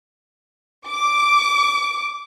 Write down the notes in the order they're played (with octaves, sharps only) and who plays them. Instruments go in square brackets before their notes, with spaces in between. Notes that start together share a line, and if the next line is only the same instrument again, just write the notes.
[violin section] D6